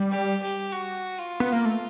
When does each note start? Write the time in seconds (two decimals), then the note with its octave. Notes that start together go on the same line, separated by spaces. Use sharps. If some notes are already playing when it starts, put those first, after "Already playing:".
Already playing: G3
0.11 G4
0.42 G4
0.72 F#4
1.19 F4
1.40 B3
1.52 A#3
1.65 A3